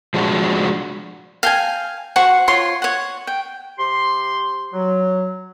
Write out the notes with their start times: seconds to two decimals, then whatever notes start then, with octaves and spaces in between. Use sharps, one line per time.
0.14 F3 G#3 D4 F#4
1.43 F5 G5 G#5
2.16 F#4 C5 F#5 C#6
2.48 F4 C#5 C6
2.82 C#5 F#5
3.27 G5
3.79 C3 G4 C6
4.73 F#3